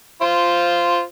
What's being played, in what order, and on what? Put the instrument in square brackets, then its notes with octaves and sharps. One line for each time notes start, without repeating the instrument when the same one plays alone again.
[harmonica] F4 C5